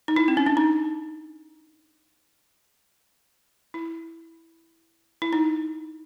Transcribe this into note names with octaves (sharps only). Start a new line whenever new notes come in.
D#4
E4
C4
C#4
D4
D#4
E4
E4
D#4